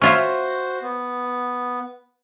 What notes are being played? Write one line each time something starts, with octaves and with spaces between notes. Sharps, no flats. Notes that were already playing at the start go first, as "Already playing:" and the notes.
C#4 F4 F#4 C5 E5
B3